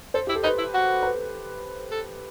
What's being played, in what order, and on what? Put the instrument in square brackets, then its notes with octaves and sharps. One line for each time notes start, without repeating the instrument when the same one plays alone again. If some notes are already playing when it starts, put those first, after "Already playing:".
[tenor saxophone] A4 [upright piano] C5
[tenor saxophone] E4 [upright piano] G4
[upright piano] A4
[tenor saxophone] D#4 [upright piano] B4
[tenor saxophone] E4
F#4
[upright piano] B4
[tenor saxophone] A4